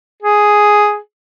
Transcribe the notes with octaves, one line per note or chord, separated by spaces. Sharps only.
G#4